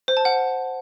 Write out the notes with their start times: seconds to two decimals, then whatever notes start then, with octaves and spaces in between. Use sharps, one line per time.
0.08 C5
0.17 A5
0.25 F#5